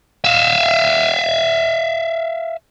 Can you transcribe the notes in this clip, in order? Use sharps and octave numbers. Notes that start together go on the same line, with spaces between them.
E5 F5